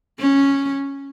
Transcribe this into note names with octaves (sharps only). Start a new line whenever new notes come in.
C#4